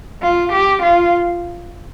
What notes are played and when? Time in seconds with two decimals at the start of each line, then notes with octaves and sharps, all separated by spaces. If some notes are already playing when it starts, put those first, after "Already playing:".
0.23 F4
0.53 G4
0.82 F4